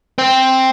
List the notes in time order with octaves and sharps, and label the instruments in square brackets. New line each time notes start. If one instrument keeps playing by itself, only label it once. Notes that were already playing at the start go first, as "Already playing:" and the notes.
[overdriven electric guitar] C4